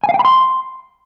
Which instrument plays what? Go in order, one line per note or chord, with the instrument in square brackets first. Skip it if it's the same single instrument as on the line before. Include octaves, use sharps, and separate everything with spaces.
[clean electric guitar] G#5
F5
G5
B5
C6